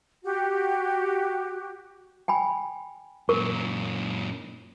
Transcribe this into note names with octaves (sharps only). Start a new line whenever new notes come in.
F#4 G4
G5 G#5 B5
F#2 A#2 A#4 C#6